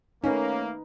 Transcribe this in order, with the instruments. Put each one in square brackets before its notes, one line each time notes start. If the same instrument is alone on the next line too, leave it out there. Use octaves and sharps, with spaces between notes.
[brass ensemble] A3 A#3 [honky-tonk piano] C#4 [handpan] D#4 B4